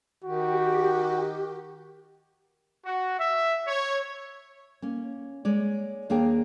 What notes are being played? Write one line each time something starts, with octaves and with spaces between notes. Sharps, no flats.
D#3 F#4 G4
F#4
E5
C#5
A#3 C#4
G#3 C#5 D5
D#2 A#3 D4 G#4 A#4 G5